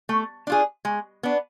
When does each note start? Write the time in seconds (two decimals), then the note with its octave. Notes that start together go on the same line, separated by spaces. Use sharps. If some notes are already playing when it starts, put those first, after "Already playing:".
0.09 A3
0.47 D4 F4 G#4
0.85 G#3
1.23 B3 D4